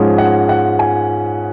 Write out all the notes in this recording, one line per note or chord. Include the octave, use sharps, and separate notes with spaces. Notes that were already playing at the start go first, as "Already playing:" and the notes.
Already playing: G#2 F3 G#3 C#4
F#5
F#5
G#5